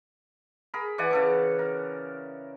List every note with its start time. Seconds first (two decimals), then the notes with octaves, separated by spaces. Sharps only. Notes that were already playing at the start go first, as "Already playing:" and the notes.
0.74 G#4 A#4 B5
0.98 E3 D5 F#5 G#5
1.11 C#3 A4 D5
1.59 A#4